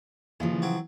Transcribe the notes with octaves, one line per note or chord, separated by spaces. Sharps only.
D#2 C#3 E3 F3
F#3 C4